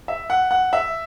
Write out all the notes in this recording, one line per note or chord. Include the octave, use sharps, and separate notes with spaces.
E5
F#5
F#5
E5